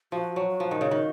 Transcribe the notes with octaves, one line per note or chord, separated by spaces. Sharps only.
F3 F#4
F#3
F#4
F3
D#3
C#3
D#3